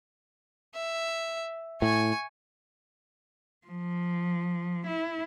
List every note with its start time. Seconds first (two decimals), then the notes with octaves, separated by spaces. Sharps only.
0.74 E5
1.82 A2 G#5 C#6
3.67 F3
4.87 E4